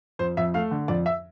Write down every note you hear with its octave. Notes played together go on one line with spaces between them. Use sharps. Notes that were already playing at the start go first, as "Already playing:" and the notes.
F2 C5
F2 E5
A3 F5
D3
F2 D5
E5